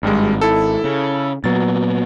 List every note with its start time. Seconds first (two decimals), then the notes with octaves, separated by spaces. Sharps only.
0.03 G#1 G2 G3 G#3
0.41 E4 A4
0.84 C#3
1.44 A#2 F#3 B3 A6